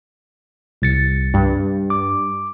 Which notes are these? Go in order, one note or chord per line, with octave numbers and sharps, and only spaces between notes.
C2 A6 C#7
G2
D6